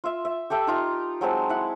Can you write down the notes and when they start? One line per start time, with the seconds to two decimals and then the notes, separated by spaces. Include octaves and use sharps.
0.04 F4 E5
0.25 E5
0.50 G4 A4 E5 G5
0.67 D#4 F4 A#5
1.21 F#3 G#3 C4 A5
1.49 E4 F#5